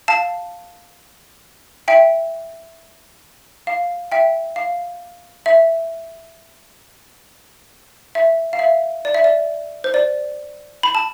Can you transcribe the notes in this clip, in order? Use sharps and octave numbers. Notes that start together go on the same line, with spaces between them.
F5 A5
E5 G5
F5
E5 G5
F5
E5
E5
F5
E5
D5
E5
D5
C5
D5
B5
A5